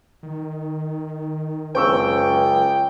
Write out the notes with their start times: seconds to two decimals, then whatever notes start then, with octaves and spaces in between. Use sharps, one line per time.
0.23 D#3
1.75 C#2 F#2 C5 G5 C#6 E6